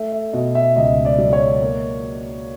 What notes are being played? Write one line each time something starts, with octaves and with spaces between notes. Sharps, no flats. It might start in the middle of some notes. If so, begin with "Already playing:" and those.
Already playing: A3 E5
E5
B2 D#5
E5
C#2 D#5
D5
F#3
C#5
A#3